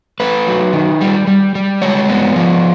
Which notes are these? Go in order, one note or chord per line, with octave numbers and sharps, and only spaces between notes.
A3 B4
F#3
D#3
G3
G3
G3
G#3 C#5
B3
F3